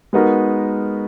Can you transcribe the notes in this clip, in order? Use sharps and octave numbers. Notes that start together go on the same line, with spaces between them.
G#3 B3 D#4 F#4 A#4